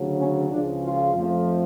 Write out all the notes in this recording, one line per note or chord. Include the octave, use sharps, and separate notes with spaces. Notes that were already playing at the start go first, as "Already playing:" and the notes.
Already playing: D2 C#3 F#3
C#4
C#2 C#3 F3 G#3 D4
F4
F2 F3 A3